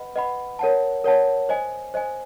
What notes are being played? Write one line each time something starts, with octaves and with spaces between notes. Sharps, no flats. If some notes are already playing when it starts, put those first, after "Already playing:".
Already playing: B4 D#5 F#5 B5
B4 D#5 F#5 B5
A#4 C#5 F#5 A5
A#4 C#5 F#5 A5
C5 D#5 G#5
C5 D#5 G#5